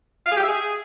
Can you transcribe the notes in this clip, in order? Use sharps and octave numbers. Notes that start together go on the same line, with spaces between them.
F5
G#4
G4
E5
G#4